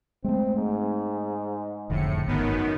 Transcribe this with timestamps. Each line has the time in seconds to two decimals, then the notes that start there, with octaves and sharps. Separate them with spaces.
0.24 G#3 A3 C4
0.56 G#2
1.90 F1 F2 A2 D3 C#7
2.26 G#1 F#2 D#3 B3